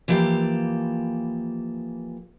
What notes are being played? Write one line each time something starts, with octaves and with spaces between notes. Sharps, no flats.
E3 F3 A#3 G4 A4